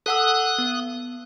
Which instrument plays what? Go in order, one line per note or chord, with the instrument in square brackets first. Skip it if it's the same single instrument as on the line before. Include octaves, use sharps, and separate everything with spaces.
[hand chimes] A4 F#5 E6 [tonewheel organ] D#6 F#6
[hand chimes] B3